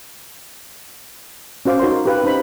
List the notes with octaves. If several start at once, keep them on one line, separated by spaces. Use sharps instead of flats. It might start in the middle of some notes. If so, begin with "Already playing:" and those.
C#4 F#4 C5 F5 D6
D#4 F#4 A#4 C#5 C6
G4 B4 F5
C#4 D#4 C5 B5